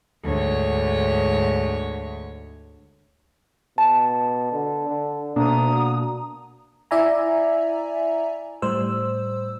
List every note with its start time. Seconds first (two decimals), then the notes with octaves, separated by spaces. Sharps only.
0.23 D2 G#2 C#5
3.78 B2 A5
4.52 D3
4.89 D3
5.36 D2 B2 A#3 D4 A#5 D#6
5.74 F#4
6.91 E4 D5 E5 G#5 A#5
8.62 A2 G3 C5 E6